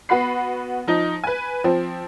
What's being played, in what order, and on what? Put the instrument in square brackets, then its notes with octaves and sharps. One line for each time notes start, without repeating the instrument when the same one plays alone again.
[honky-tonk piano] B3 F#4 F#5 B5 C7
F3 D#4
B4 G#5
F3 C4